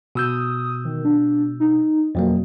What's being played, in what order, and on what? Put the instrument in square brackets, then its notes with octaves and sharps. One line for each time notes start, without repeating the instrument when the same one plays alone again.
[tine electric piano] B2 E6 G6 [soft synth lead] D#6
[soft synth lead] D#3
D4
D#4
[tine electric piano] F2 F#3 A#3 [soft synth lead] B2